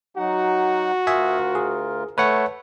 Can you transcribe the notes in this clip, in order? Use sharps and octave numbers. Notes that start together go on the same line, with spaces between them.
F#3 D#4 F#4 F#5
D2 F4 A#4 E5 G#5 D#6
G#4
A3 B4 C#5 F#5